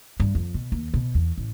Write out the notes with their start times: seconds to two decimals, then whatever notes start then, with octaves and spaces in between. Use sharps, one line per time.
0.20 G2
0.35 F2
0.54 B2
0.72 D#2
0.94 B2
1.15 E2
1.38 A1